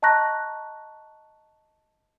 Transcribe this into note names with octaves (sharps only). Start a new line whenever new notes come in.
D#5 A5 A#5 C#6 F#6 A#6